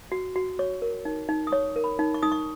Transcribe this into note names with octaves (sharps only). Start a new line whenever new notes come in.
F#4
F#4
C#5 C#6
A#4
D#4
D#4
D#6
C#5 C#6
A#4
B5
D#4
C#6
D#4 D#6
C#6